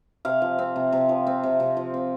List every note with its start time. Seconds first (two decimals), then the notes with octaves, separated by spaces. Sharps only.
0.25 C3 F5
0.42 F3
0.59 C4
0.76 C3
0.92 C3
1.09 F3
1.27 C4
1.43 C3
1.60 C3
1.77 F3
1.94 C4